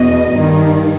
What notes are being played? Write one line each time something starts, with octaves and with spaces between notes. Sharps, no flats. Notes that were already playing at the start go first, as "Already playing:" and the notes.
Already playing: E2 B2 D#5
G2 D#3